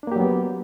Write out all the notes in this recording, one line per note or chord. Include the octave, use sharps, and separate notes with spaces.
F#3 A#3 B3 D4 G4